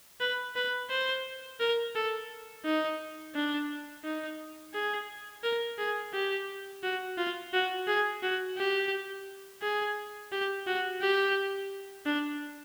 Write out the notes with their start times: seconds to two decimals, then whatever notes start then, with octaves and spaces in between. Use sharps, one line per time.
0.20 B4
0.56 B4
0.90 C5
1.60 A#4
1.95 A4
2.65 D#4
3.35 D4
4.04 D#4
4.74 G#4
5.43 A#4
5.78 G#4
6.13 G4
6.83 F#4
7.18 F4
7.53 F#4
7.87 G#4
8.23 F#4
8.58 G4
9.62 G#4
10.32 G4
10.67 F#4
11.01 G4
12.06 D4